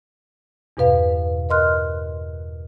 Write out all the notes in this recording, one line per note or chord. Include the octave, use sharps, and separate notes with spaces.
E2 G2 B2 B4 F5
A#4 D#5 C6 F6 F#6